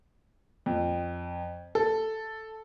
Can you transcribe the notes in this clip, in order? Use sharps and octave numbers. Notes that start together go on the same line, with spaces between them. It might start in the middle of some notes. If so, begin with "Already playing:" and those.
F2
A4